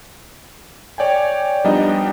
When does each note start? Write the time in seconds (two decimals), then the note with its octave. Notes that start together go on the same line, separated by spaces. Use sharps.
0.98 C#5 D5 G5 G#5
1.64 F3 G3 B3 D4 D#4 D#5